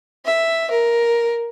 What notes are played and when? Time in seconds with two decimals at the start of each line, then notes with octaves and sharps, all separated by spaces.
0.25 E5
0.71 A#4